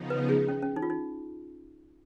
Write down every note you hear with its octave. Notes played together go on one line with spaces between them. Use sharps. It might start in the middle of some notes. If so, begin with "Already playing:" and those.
Already playing: C#3 F3 B3 D#4
B4
G#4
C#4
C#4
D#4
F4
D#4